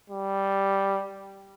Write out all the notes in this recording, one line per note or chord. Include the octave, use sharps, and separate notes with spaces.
G3